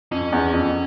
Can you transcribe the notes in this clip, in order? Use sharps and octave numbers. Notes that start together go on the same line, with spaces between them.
F2 C#4
E2
F2